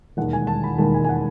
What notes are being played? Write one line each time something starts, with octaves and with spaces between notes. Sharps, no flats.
E1 D#2 D#3 G#3 F#5
G#5
A5
B5
E1 D#2 D#3 G#3 A5
G#5
G#5
F#5